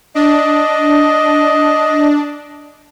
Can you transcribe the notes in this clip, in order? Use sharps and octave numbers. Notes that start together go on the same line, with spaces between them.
D4 D#5